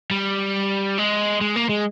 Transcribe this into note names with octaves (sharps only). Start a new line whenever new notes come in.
G3
G#3
G#3
A#3
G#3